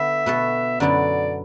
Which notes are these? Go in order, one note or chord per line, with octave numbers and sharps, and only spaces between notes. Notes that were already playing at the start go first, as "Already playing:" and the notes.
Already playing: D3 B3 A4 E5
B2 B3 F#4 A4
F#2 D3 B3 E4 A4 D5